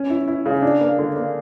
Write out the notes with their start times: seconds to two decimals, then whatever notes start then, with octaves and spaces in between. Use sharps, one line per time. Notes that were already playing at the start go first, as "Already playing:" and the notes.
Already playing: C#4
0.10 E4
0.28 E4
0.46 C#3
0.62 D4
0.81 A#3
0.99 D3
1.16 A#3